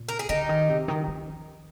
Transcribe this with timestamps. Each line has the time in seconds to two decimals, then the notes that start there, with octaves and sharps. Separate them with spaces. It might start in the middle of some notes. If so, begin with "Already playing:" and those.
Already playing: A#2
0.09 A#4
0.19 G#4
0.29 D3 D#4 G4
0.49 D#3
0.69 C3
0.88 D#3
1.08 F3